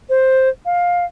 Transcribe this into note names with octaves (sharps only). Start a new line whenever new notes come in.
C5
F5